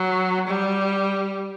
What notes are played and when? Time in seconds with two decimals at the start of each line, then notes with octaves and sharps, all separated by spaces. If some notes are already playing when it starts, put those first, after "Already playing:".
Already playing: F#3
0.47 G3